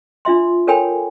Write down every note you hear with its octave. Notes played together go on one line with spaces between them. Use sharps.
D4 F4 E5 C6
A4 A#4 C#5 G5 G#5 B5